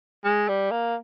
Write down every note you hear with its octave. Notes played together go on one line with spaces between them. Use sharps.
G#3
G3
A#3